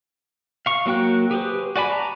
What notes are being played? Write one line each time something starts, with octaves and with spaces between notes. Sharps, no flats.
F5 C#6
F#3 A#3 F#4 G5 F#6
G4 G#4 B4 C5
F#4 D5 G#5 B5
A5 A#5